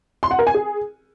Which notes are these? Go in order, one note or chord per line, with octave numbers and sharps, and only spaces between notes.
C6
F#5
A#4
G#5
G#4